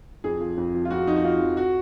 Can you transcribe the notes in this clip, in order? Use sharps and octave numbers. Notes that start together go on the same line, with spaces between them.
F2 G#4
F3
F2
F3
F4
F2 F#4
F3 D#4
F#4
F2 F4
F3
F#4